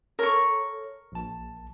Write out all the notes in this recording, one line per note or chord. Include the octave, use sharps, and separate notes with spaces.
A4 A#4 C#5 C#6
A#1 A5